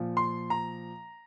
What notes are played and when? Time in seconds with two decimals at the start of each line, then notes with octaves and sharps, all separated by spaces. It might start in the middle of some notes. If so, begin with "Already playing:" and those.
Already playing: A#2 F3
0.17 C6
0.50 A#5